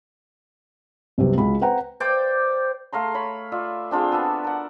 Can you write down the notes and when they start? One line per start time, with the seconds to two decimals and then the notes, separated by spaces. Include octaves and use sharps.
1.18 C2 F#2 C3 B3
1.37 C#2 F#4 B5
1.61 B4 C5 F#5 G5 A#5
2.00 C5 D5 G5
2.93 A3 F5 A#5 C6
3.14 C#5 B5
3.52 F4 D5 E5
3.91 C4 D4 F4 G#4
4.12 B3 F#4 E5 A5
4.44 A#4 F#5